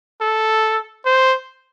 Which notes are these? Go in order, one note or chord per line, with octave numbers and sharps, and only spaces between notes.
A4
C5